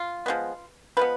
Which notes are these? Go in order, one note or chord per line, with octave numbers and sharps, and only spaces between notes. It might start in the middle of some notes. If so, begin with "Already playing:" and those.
Already playing: F4
F3 G#3 B3
F3 G#3 B3 B4